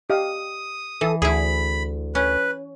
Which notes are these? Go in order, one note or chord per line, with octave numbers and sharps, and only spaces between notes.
G4 D#5 F5 D#6
E3 A4
D2 E4 G#4 B5
C#4 B4